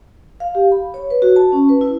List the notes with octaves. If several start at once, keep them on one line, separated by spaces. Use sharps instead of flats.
F5
G4
B5
C#5
B4
F#4
A5
C#4
B4
E4